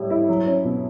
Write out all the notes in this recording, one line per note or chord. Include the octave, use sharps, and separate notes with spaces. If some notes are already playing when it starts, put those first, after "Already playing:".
Already playing: A2 G3
E4
F#3
C#4
B2